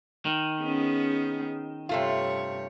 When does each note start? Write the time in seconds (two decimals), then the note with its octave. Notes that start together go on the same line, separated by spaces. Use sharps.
0.25 D#3
0.61 B3 C#4 G#4
1.89 G2 C3 A3 F4 C#5